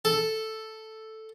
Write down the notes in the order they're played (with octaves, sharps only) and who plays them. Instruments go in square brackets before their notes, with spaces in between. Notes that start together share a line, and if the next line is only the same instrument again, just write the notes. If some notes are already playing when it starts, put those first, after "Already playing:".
[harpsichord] A4